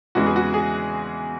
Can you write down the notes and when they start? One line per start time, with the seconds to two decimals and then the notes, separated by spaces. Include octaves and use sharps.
0.15 E2 C#3 E3 G#3 F#4
0.26 G#4
0.36 F#4
0.54 G#4